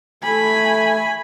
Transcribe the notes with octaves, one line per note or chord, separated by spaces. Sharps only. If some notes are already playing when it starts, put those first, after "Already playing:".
A3 G#5 B5